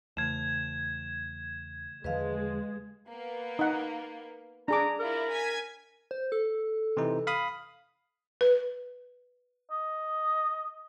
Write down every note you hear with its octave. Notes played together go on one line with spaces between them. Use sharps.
E2 C#3 A3 G#6 E7
E2 D3 F3 G#3 B4 D#5 F5
A#3 B3
D#4 F#5
D4 G#4 A#5 D6
E4 F4 A#4 D5
G#5 G#6 B6
C5
A4
C3 E3 D#4
F5 B5 D#6
B4
D#5